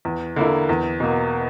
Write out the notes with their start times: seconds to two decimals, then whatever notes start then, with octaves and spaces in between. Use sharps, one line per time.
0.05 E2
0.36 D3 A#3 E4
0.69 E2
1.00 B2 A#3